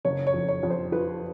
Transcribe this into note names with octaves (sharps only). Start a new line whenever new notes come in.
F#1 C#5
C#5
F2
C#5
F2
C5
F3 B4